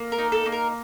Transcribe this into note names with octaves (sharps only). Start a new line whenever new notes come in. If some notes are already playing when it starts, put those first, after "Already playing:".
Already playing: A#3
A#4
D#4
A4
A#3
A#4